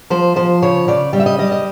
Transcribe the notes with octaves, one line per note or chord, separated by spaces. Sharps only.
F3 C5
F3 C5
C#3 C#5
C#3 D5
G3 D#5
E5
D#5
G3 D#5
D#5